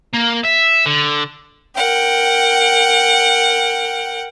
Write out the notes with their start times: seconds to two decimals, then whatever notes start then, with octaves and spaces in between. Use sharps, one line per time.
0.14 A#3
0.45 E5
0.86 D3
1.75 A#4 F#5 G5